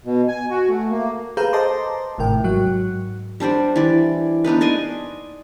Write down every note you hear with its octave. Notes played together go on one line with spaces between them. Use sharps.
B2
G#5
F#4
A3
A#3
G#4 A4 B4 F5 A#5 G6
C5 D#5 A5 A#5 C6 D6
G#1 A2 C3 A#4 G5
G#2 F#3 F#4 F#6
G3 D4 C5 D5
E3 D5
B3 D4 D#4 B4
D5 D#5 G#5 C6